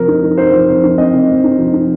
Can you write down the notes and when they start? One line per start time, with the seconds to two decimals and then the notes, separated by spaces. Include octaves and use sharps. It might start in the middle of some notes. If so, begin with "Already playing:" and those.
Already playing: C3 F3 A#4
0.08 D#4
0.23 D#4
0.38 D#4 C5
0.53 F3
0.68 C3
0.84 D#4
0.98 C4 D#5
1.14 C3
1.29 C4
1.44 D#4
1.58 F3
1.73 D#4